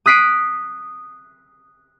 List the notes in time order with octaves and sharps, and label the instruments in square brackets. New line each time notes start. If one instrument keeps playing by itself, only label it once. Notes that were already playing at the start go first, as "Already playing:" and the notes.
[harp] D#6 F#6 B6 C7 D7 D#7